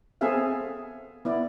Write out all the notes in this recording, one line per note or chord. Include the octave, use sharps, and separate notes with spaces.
B3 C4 G#4 A4 E5 F5
B3 E4 D5